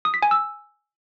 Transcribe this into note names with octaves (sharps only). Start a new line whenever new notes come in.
D#6
B6
G#5
E6